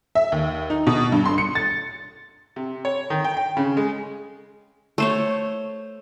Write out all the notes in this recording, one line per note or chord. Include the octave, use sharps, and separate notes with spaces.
E5
D#2
D#4
B2
G2
C6
C#7
A6
C3
C#5
D#3
G5
G5
C#3
G#3
A3 C5 C#5